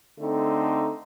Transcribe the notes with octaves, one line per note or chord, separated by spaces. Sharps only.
D3 A3 C4 D#4